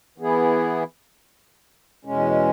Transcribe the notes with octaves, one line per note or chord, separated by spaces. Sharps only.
E3 B3 E4 G#4
E2 B2 G#3 C#4